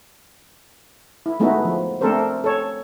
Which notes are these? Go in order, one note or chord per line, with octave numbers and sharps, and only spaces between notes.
E4
G#3 A3 B3 D#4 E4 F#4
F3
A3 C4 D4 A4 A#4 C5
A4 C#5